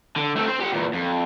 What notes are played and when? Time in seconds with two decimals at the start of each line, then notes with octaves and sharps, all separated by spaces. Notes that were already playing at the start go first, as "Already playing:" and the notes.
0.16 D3
0.36 A3 C4
0.48 C4 C5
0.61 G4 F#5
0.72 E2 A#2
0.94 F2